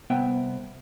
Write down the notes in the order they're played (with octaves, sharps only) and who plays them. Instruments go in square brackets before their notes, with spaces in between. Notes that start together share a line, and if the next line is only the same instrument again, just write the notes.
[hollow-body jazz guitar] C2 B3 E5 G5